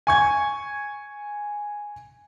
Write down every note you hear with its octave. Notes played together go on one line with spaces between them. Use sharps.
G#5 C#6 G#6